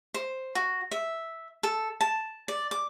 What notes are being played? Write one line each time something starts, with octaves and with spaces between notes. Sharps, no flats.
C5
F#4
E5
A4
A5
D5
D6